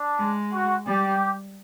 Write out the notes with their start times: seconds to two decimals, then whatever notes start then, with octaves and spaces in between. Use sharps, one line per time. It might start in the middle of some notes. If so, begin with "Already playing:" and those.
Already playing: D4
0.19 G#3
0.52 F#4
0.86 G3 G4